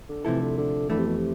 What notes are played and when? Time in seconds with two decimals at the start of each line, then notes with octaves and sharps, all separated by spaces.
0.09 D3
0.25 C3 E3 F3 A3 E4 A4
0.41 D3
0.58 D3
0.89 F2 D3 E3 A3
0.98 C3
1.07 B2
1.17 C3